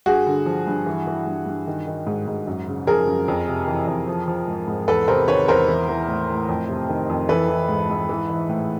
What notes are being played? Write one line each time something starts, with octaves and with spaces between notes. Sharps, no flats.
G2 F#4 G#4
D3
F3
G2
E3
E3
G2
G2
D#3
D#3
G#2
G#2
F#2
C#3
F3 G#4 A#4
F#2
F2
C3
E3
F2
F3
F3
G#2
G#2
E2 A4 B4
C3 A#4 C5
D#3 B4 C#5
E2 A#4 C5
E3
E3
A2
A2
F2
C3
D#3
F2
E3 A4 B4
E3
G#2
G#2
E3
E3
A2